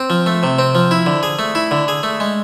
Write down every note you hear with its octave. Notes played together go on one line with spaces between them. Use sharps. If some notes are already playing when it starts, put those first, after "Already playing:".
Already playing: C4
F3
A3
C3
C4
F3
E4
D3
G#4
A3
E4
D3
G#4
A3
G#3